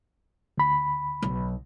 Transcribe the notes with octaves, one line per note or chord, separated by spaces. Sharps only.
D2 B5
B1